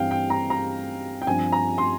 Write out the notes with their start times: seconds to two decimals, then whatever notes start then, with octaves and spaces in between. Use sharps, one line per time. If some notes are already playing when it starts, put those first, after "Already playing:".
Already playing: G2 E3 G3 C4 F5 G5
0.11 G5
0.30 A#5
0.50 A#5
1.22 G5
1.27 G2 F3 C4 G#5
1.52 A#5
1.78 C6